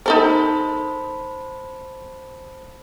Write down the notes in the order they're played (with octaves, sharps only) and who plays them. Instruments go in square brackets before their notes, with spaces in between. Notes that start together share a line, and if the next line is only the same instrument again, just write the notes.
[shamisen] D#4 A4 A#4 [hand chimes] C5 A5 B5